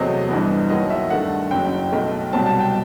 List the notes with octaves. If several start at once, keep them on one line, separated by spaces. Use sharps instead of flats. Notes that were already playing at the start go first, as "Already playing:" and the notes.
Already playing: E2 C3 F#3 A3 C4 D#5
G1 G2 E3 B3
D#2 D#3 F#3 D#5
E5
G2 D#3 A3 F#5
F#1 F#2 F#3 G5
B1 B2 A3
C2 B2 F#3 C4 A5
A5
G5